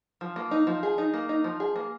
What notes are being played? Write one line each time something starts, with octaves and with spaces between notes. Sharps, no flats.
F3
A#3
D#4
F3
G#4
D#4
A#3
D#4
F3
G#4
A#3